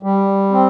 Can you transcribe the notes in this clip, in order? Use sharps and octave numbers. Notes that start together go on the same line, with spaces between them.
G3
C4